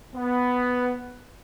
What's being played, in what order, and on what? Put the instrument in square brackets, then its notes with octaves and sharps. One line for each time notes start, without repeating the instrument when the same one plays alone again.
[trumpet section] B3